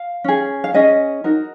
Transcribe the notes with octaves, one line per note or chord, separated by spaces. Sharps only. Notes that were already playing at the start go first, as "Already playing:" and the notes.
Already playing: F5
C#4 G#4
F5
C#4 G#4 D#5
D#4 F#4 A#4